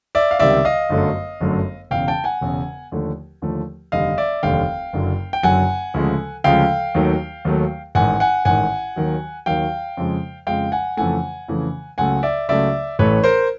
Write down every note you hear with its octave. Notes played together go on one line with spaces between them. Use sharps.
D5 E5
F5
C#2 C3 D#3 G3 D5 E5
D#5 F5
G1 F#2 D3 F#3 A3
G1 F#2 D3 F#3 A3
E1 E2 C#3 F5 G5
G5 A5
F#5 G#5
E1 E2 C#3
D#2 D3 F3 A3
D#2 D3 F3 A3
F1 D#2 D3 G3 D#5 F5
D5 E5
F1 D#2 D3 G3 F5 G5
F#1 F#2 D3 F#3
G5
F#1 F#2 D3 F#3 F#5 G#5
D2 C#3 F3 G#3
D2 C#3 F3 G#3 F5 G5
D#2 D#3 F#3 A3
D#2 D#3 F#3 A3
A1 G#2 D#3 F#5 G#5
F#5 G#5
A1 G#2 D#3 F#5 G#5
D#2 D#3 F#3
D#2 D#3 F#3 F5 G5
F2 C#3 F3 G#3
F2 C#3 F3 G#3 F5 G5
F#5 G#5
F2 C#3 E3 A3 F#5 G#5
F2 C#3 E3 A3
C#2 C#3 F#3 A3 F#5 G#5
D5 E5
C#2 C#3 F#3 A3 D5 E5
A1 A2 E3 A3 B4 C#5
A#4 C5